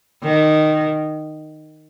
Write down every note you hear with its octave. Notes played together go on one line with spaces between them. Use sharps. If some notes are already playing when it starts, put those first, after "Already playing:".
D#3